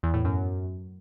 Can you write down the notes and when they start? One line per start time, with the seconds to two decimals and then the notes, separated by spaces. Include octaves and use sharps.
0.03 E2
0.14 A2
0.25 F#2